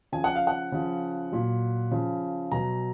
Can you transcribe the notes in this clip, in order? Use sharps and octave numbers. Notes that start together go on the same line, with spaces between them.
C#3 F3 G#5
F#5
F5
F#5
C#3 F3
A#2 F#3
C#3 F3
B2 F#3 A#5